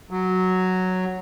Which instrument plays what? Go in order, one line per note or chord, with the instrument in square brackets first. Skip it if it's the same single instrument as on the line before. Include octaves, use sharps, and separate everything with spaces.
[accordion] F#3